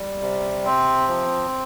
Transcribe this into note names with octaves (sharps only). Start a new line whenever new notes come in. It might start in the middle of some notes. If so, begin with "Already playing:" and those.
Already playing: G3
C3
C4
F3